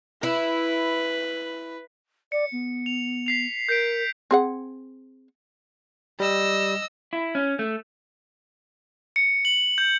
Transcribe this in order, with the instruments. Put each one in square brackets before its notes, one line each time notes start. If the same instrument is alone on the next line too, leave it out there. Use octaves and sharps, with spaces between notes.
[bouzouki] E4 [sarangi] B4
[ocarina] D5 [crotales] C#7
[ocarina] B3
[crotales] F7
B6 C7 F7
[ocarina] A#4 [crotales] G6 B6 D7
[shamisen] C4 G#4 F#5
[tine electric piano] G3 [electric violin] D#5 E6
[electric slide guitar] E4
C#4
A3
[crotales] C#7
F#7
G6